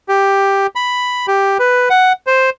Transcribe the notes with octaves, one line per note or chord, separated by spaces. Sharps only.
G4
B5
G4
B4
F#5
C5